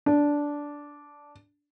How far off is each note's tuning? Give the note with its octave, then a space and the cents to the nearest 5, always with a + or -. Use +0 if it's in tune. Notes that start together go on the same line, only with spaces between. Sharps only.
D4 -10